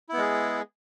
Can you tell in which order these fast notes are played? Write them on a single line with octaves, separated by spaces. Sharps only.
E4 B3 G#3 G#4